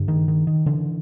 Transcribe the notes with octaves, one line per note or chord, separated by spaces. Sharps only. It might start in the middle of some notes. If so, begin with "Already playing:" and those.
Already playing: G2 D3
D#3
D#3
D#3
D3 E3